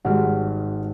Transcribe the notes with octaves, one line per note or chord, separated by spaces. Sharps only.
G#1 G3 G#3 F#4 F6